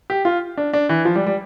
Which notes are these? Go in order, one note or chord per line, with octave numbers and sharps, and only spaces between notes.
G4
F4
D4
D4
E3
F3
G3
G3